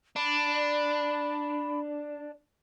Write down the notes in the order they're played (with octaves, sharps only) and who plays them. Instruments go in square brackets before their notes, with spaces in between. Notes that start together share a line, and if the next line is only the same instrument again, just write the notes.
[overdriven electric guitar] D4 [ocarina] B5